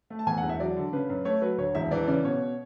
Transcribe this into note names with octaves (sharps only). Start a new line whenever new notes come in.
A3
A5
E2 G#5
F#5
E1
E5
F#3 D5
D3
C#3 B4
F#2
A3 C#5
F#3 B4
D2 C#5
E1 E5
E3 D5
C#3 D5
B2 C#5